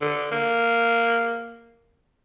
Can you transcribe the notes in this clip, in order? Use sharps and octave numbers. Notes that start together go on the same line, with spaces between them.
D3
A#3